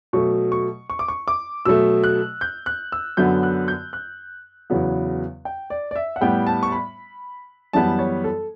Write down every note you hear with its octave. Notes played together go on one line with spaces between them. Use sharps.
B2 F#3 A3 C#6
C#6
C#6
D6
C#6
D6
B2 F#3 A3 E6
F#6
G6
F#6
E6
F#2 D3 F#3 B3 G6
F#6
G6
F#6
E2 C#3 F#3 B3
G5
D5
D5
E5
F#5
A2 G3 B3 G5
A5
C#6
B5
F#2 E3 G3 B3 A5
C#5
A4